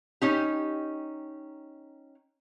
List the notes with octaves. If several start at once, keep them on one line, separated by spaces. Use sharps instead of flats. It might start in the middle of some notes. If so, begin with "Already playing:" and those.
C#4 D#4 G4